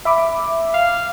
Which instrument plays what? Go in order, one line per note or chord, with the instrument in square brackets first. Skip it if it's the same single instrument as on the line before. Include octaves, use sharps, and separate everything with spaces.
[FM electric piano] E5 B5 D6
[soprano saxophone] F5